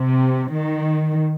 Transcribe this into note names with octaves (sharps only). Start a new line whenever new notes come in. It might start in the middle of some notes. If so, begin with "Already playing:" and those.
Already playing: C3
D#3